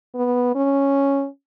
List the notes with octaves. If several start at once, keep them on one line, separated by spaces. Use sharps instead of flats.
B3
C#4